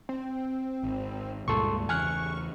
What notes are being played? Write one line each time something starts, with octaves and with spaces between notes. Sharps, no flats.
C4
G#1
C#2 G2 A#2 G#3 A4 C6 C#6
E2 C#3 G#5 C#6 F6 F#6